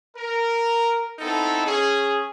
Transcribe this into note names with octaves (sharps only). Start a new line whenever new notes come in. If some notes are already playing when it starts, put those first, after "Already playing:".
A#4
B3 C4 D#4 E4 A4
C#4 G#4